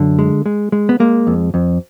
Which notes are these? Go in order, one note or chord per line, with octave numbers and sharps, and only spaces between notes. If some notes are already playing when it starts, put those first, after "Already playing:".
Already playing: F#2 D3
G#3
G#3
G#3
B3
G#3 A#3
F2
F2